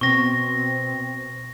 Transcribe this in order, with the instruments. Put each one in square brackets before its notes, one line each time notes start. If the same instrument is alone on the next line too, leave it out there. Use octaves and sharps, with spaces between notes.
[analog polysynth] B2 C4 [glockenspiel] C#6 A#6